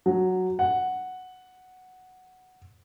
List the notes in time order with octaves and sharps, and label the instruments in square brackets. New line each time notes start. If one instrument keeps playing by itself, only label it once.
[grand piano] F#3
F#5